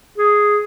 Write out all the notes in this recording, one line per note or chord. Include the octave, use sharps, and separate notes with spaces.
G#4